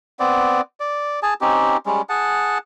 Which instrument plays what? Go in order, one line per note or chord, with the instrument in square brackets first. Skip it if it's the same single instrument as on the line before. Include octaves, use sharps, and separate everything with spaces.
[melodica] B3 C4 D5
D5
G#4 G#5 A5
C4 C#4 D#4 G4
G3 G#3 C#4
G#4 F#5 A5